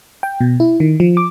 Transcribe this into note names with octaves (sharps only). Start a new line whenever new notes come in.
G5
B2
E4
D#3
F3
D6